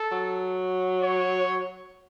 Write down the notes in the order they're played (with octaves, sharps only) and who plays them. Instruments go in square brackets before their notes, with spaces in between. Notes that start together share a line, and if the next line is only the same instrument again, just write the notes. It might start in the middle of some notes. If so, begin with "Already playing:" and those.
Already playing: [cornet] A4
[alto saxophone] F#3
[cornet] C#5